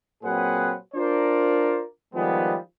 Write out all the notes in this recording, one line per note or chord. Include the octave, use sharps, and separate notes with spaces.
A#2 F#3 C4 G#4 B4 F#5
D4 F4 A#4 C5 D5
D#3 F3 G3 G#3 B3